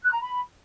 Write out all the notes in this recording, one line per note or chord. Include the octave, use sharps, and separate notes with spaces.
F#6
A#5
B5